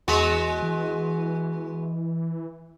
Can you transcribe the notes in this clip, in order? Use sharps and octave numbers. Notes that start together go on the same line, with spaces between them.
E2 G#3 B3 F#4
E3